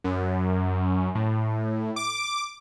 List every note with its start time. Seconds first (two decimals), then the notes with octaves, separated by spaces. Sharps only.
0.04 F#2
1.15 A2
1.96 D6